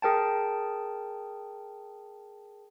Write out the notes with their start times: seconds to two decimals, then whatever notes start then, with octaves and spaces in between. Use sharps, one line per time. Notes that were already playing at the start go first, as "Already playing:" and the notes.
0.02 G#4 A#4 G5 A5